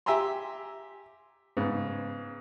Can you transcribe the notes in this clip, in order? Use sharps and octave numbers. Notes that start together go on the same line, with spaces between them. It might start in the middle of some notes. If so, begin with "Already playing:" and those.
G4 E5 G#5 A#5 C6
G#2 C#3 B3